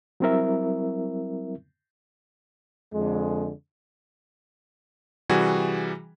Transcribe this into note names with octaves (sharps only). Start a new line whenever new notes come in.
F#3 G3 C4 E4 A#4 E5
F2 D3 G#3
C3 E3 G3 F#4 G#4 G#5